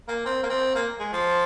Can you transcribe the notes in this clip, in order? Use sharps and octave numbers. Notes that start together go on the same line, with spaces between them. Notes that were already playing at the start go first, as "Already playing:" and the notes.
A#3
C4
A#3
C4
A#3
G#3
F3